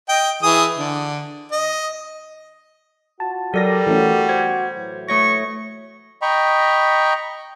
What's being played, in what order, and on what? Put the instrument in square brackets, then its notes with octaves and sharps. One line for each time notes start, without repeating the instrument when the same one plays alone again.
[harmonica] D#5 G5
E3 G#4 D#6
D3
D#5
[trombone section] F4 F#4 [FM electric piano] A5
[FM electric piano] F#3 D5 A#6 [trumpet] G3 [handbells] A4 A#4
[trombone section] B2 F#4 [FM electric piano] E3 A3 C#4
[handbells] C5 [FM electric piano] G#6
[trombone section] A2 E3 F#3
[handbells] A3 C#5 A#6 [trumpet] C#6
[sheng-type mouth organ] D#5 G5 A#5 B5 C#6